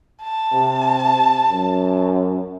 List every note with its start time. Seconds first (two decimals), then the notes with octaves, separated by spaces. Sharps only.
0.22 A5
0.52 C3
1.51 F#2